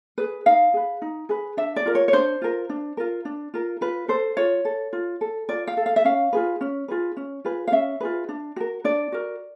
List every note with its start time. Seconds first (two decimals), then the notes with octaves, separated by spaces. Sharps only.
0.18 G#4 B4
0.46 D#4 F5
0.74 G#4 B4
1.02 D#4
1.29 G#4 B4
1.57 D4 E5
1.76 D5
1.86 F4 A#4
1.95 C#5
2.08 C#5
2.13 D4 C5
2.42 F4 A#4
2.69 D4
2.97 F4 A#4
3.25 D4
3.54 F4 A#4
3.81 F4 B4
4.08 A4 C5
4.37 F4 C#5
4.65 A4
4.93 F4
5.21 A4
5.49 F4 D5
5.67 F5
5.77 A4
5.86 F5
5.96 E5
6.05 C#4 F5
6.33 F4 G#4 B4
6.61 C#4
6.88 F4 G#4 B4
7.17 C#4
7.45 F4 G#4 B4
7.67 F5
7.72 C#4 E5
8.00 F4 G#4 B4
8.29 D4
8.56 F#4 A#4
8.84 D4 D5
9.12 F#4 A#4